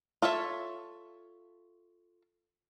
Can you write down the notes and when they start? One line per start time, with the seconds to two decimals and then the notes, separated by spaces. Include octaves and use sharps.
0.22 F4 A4 C#5 E5